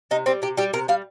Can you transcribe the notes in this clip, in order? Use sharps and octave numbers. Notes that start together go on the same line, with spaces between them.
C3 D#4
G3 C4
C3 G4
G3 G4
C3 A#4
G3 F5